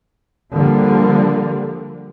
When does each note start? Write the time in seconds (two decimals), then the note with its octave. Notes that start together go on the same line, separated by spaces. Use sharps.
0.54 D3 F3 G3 A#3